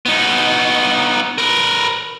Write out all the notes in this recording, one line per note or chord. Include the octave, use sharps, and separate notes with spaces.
B3 D#4
A#4 B4